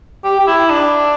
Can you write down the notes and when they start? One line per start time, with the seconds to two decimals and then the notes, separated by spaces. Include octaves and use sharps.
0.24 G4
0.40 G4
0.47 E4
0.70 D4